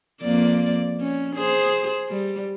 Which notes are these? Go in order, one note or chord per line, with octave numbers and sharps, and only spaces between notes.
F2 A#3 D5
C#4
G#4 C5
G3